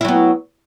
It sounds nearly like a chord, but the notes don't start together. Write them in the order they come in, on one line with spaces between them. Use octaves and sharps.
E4 F#3 B3